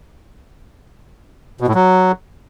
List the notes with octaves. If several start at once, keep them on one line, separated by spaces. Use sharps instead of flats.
B2
A2
F#3